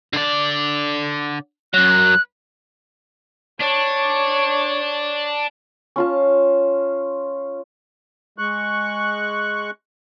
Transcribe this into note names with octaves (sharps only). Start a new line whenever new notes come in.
D3 D5
F#2 F#3 F#6
D4 C#5
C#4 F4 A5
G#3 C#6 F#6